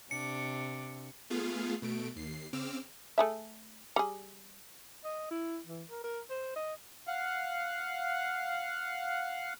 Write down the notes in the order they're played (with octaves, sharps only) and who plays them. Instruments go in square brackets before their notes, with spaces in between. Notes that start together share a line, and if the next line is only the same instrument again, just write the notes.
[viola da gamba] C3 [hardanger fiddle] D4 [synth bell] C#7
[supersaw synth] A3 B3 F4 G#4 F5
B2 A3 D7
D#2 C7
C#3 C4 D6 E6 F6
[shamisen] A3 G#4 E5
G3 G#4
[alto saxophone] D#5
E4
E3
A#4
A#4
C5
D#5
[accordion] F5 F#5